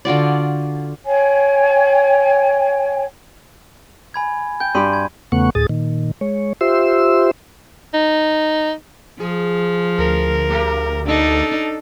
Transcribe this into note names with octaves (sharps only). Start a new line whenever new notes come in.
D3 F4 F#4 D5
C#5 G5 G#5
G#5 B5 G#6
G5 G6
G2 G4 B5 C6 D#7
G#6
E2 C#3 A3 B3 F#5 C#6
D2 A2 G#4 D#6 A6
A#2 D#3
G#3 C#5
F4 G4 C5 E5 C6 E6
D#4
F3 G#4
D2 A#4
A3 A#3 G4
D4 D#4 A4